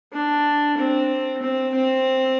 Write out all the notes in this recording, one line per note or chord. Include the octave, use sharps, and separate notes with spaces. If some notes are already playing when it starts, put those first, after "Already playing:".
D4
C4
C4
C4